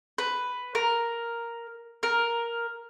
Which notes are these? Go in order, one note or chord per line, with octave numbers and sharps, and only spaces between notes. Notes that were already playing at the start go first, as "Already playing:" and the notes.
B4
A#4
A#4